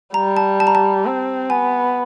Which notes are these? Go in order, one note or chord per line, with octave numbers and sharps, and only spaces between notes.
G3 A#5
A5
A5
A#5
A5
C4
B3 G#5